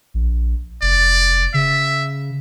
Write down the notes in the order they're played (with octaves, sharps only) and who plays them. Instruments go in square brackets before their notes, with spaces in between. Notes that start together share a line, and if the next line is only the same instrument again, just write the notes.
[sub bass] A#1
[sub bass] F1 [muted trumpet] D5
[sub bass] C#3 [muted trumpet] E5